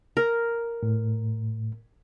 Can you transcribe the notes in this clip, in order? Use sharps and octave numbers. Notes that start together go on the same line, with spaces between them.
A#4
A2